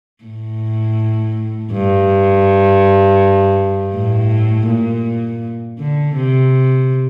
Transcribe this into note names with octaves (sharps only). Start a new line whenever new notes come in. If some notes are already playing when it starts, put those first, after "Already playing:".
A2
G2
A2
A#2
D3
C3